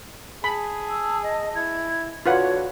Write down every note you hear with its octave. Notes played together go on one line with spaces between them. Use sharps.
G#4 A5 B5
E6
D#5
E4 G#6
D3 F4 F#4 B4 C#5 F#5